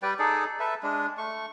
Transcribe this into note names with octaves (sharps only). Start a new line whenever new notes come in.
G3 B4 D5 G5
D#4 G#4 A4 D5
A4 B4 E5
G#3 D4
A3 C#6